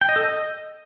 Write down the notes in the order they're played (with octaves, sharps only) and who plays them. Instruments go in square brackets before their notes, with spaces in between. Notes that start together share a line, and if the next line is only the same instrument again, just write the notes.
[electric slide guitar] G5
D#5
A4
D#5